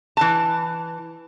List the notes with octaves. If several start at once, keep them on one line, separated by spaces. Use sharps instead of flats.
E3 A5